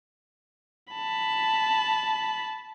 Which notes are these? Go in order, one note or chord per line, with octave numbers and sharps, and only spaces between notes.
A5 B5